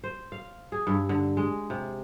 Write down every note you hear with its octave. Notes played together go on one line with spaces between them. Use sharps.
C5
F5
G#4
G2
D3
G#3
C3